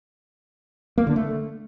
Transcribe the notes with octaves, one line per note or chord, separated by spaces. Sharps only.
A#3
D3
A3